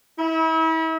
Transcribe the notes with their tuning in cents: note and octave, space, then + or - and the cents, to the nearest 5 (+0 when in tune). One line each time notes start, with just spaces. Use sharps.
E4 -35